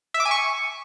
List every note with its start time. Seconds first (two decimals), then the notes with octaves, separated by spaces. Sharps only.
0.14 E5
0.20 D6
0.25 G#5
0.31 C#6